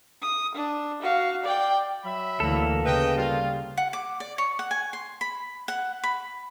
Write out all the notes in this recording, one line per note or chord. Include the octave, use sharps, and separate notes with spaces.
D#6
D4
F#4 F5
D5 G5
F#3 E5 B5
D2 E3 A#3 A4
C#3 B4 D#5 G5
G3 F4
F#5
D6
D5
C#5
F#5
G#5
C6
B5
F#5
B5